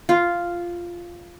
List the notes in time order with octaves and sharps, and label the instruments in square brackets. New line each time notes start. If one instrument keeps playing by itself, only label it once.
[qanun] F4